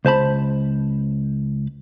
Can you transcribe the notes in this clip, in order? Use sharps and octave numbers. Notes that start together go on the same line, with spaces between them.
C#2 C5 A5 B5